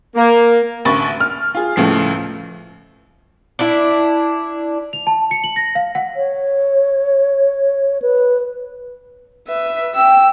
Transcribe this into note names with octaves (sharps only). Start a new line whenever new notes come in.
A#3
A1 D2 B5 C#6 A6
F6
F4 G#4
C#2 A2 F3 C7
D4 E4
F7
A5
C#7
F#7
A#6
F5
F#5
C#5
B4
B4 E5
G5 E6